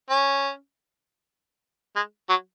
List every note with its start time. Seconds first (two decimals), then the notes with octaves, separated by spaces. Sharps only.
0.10 C#4
1.96 G#3
2.29 F#3